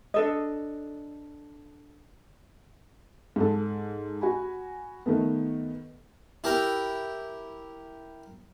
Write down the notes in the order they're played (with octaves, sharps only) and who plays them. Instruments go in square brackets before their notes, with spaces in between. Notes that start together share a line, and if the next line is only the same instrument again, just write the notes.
[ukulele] D4 A4 D#5
[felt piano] G#2 A4
F#4 G#5 B5
D#3 A3 B3
[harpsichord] E4 G4 A#4 G5